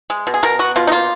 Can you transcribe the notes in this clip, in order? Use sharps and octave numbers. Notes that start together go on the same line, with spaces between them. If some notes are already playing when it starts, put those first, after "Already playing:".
G#3
B2
G#4
B2 A#4
B3 F#4
B2 F4
D#4
A#3 F4